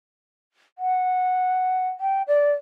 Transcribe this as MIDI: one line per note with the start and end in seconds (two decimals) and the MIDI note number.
0.78 1.89 78
2.00 2.22 79
2.27 2.51 74